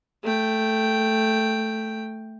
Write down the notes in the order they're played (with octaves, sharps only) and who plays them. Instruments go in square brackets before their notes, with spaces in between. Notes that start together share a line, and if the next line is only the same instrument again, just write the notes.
[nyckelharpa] A3 G5